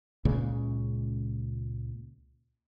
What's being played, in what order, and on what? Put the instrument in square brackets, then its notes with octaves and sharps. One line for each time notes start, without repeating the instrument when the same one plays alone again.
[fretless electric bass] C#2 A#2 C#3 G#3